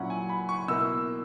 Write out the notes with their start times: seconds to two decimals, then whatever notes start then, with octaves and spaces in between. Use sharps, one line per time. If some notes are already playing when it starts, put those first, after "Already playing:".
Already playing: A#2 F#3 C#4 E4 F#5
0.10 G#5
0.29 B5
0.49 C#6
0.68 B2 A#3 E4 E6